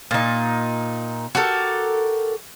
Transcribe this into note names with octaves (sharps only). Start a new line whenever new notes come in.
A#2 D#4
F#4 G4 A4 A#4